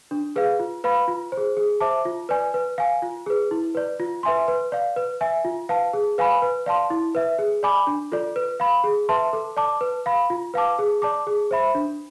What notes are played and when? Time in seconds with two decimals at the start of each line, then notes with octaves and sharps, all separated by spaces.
0.11 D4
0.36 G#4 B4 F5
0.59 F4
0.84 B4 F5 B5
1.08 F4
1.32 C5
1.37 G#4
1.57 G#4
1.80 C5 E5 A5 D6
2.05 F4
2.29 B4 D5 G#5
2.54 B4
2.78 F5 G#5
3.02 F4
3.26 G#4 B4
3.51 E4
3.75 B4 D5
4.00 F4
4.23 B4 E5 G#5 C6
4.48 B4
4.72 D5 F5
4.96 B4
5.21 E5 G#5
5.45 F4
5.69 B4 F5 A5
5.93 G#4
6.18 B4 F5 G#5 B5
6.42 B4
6.66 D5 F5 A5 C6
6.90 E4
7.15 B4 E5
7.39 G#4
7.63 D5 G#5 B5 D6
7.87 D4
8.12 F4 A4 D5
8.36 B4
8.60 F5 B5
8.84 G#4
9.09 B4 E5 A5 C6
9.33 A4
9.57 D5 A5 D6
9.81 B4
10.06 F5 B5
10.30 F4
10.54 B4 F5 A5 D6
10.79 G#4
11.02 D5 A5 D6
11.27 G#4
11.51 C5 E5 B5
11.75 D4